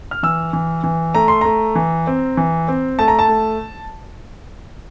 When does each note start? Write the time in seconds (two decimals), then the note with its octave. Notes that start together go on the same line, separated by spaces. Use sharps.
0.11 F6
0.23 E3 E6
0.53 E3
0.84 E3
1.14 A3 A#5
1.28 C6
1.41 A3 A#5
1.75 E3
2.07 C4
2.37 E3
2.68 C4
2.99 A3 A5
3.08 A#5
3.19 A5
3.29 A3